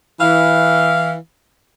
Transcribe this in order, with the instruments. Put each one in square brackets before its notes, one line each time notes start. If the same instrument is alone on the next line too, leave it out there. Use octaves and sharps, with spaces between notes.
[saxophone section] E3 F5